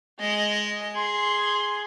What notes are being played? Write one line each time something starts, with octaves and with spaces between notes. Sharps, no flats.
G#3 D#5
G#4 C6